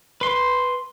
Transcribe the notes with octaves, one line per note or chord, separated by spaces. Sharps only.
B4 C6